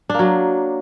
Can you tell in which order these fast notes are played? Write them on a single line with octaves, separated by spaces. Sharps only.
D4 A#3 F#3